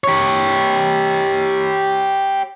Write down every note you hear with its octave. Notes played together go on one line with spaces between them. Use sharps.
G4 C#5